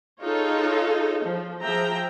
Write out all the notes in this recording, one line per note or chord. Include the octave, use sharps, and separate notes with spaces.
D#4 F4 G#4 A4 C#5
F3
F3 G#4 E5 G5 A#5